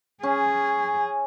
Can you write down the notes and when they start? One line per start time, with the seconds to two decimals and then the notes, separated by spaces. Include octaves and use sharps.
0.23 C#4 G#4